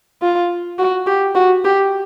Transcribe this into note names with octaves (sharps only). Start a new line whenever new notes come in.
F4
F#4
G4
F#4
G4